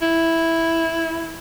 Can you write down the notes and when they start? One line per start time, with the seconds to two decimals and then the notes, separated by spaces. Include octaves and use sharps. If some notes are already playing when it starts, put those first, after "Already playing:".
0.02 E4